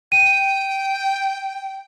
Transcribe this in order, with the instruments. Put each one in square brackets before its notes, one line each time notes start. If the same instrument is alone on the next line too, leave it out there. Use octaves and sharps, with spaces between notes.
[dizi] G5 [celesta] D#7